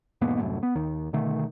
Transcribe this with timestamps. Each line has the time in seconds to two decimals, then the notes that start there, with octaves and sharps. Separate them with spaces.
0.21 E1 G#2 A#3 B3
0.39 C2 F#2 A2
0.63 B3
0.75 D#2 D#3
1.13 B2 D3 D#3 A3